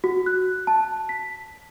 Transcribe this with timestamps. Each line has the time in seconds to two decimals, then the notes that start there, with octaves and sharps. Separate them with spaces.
0.04 F#4
0.26 F#6
0.67 A5
1.09 B6